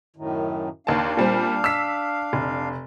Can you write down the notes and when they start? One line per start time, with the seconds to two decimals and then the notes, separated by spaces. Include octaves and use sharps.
0.16 F#2 A2 D#3
0.87 D#2 D4 F5 A5
1.17 A#2 G3 C4
1.64 E6 B6
2.33 F1